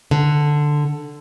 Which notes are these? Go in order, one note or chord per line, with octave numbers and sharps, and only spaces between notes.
D3